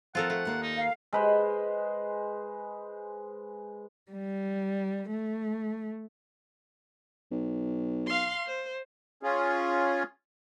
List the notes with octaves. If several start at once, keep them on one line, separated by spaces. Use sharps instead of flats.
F3 C4 F4 A4 A#4 F#5
A3 F4
D#2 A#3 D5
D#4
F5
G#3 B4 C5
G3
A3
B1
F5 C6
C5
C#4 F4 G#4